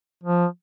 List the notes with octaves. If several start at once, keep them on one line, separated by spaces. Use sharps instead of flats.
F3